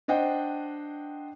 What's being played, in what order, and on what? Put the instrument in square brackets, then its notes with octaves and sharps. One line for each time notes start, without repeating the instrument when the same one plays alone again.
[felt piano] D4 C5 D#5 F#5 G5